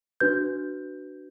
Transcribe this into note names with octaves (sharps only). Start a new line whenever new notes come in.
D4 F#4 B4 G6